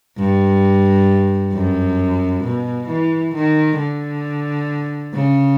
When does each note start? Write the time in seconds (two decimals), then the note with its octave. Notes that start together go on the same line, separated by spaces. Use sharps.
0.18 G2
1.53 F#2
2.44 B2
2.89 E3
3.34 D#3
3.79 D3
5.14 C#3